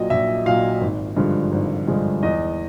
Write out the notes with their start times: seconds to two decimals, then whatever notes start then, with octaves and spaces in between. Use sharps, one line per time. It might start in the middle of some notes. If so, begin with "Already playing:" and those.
Already playing: A#1 A#2 F#3 D#5
0.10 A#1 E5
0.46 A#2 F#3 F5
0.81 G#1
1.17 G2 D3 F3 G#3
1.52 G#1
1.87 G2 D3 F3 G#3
2.23 E2 D#5